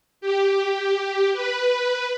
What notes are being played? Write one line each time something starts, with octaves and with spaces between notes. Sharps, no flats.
G4
B4